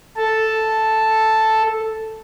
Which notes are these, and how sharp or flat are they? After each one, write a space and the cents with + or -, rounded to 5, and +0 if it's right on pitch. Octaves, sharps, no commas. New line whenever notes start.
A4 +0 A5 +0